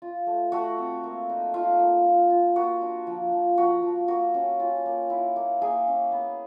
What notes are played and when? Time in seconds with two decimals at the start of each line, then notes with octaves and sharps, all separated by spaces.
0.02 F4
0.27 A3
0.52 A3 F#4
0.78 C4
1.04 A#3
1.29 D#4
1.54 D#4 F4
1.80 A#3
2.05 F4
2.30 F4
2.56 A#3 F#4
2.81 D4
3.07 F3
3.32 F3
3.57 F3 F#4
3.83 F3
4.08 A#3 F#4
4.34 C#4
4.60 F4
4.86 A#3
5.10 E4
5.36 A#3
5.62 A#3 G#4
5.87 C#4
6.12 B3